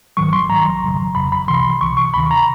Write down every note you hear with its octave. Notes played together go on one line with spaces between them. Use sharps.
A#1 G#2 D#3 F#3 C#6
C6
A#1 G#2 D#3 F#3 A#5
G1 F2 C#3 F#3
G1 F2 C#3 F#3 B5
B5
C2 C3 E3 C6
C2 C3 E3 C#6
C#6
D2 C3 D#3 B5
A#5